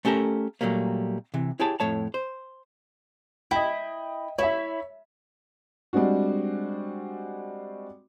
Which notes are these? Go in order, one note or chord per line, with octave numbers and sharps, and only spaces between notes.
A3 C#4 G4 A4 A#4
A#2 F#3 G3 A3 A#3
C3 E3
E4 G4 G#4 C#5 G5 A5
F2 A2 A3 C#5 A5
C5
E4 D#5 G5
E4 C#5 E5
G3 G#3 C4 D4 F#4